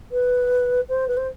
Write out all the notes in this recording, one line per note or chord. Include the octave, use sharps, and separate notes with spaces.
B4
C5
B4
C5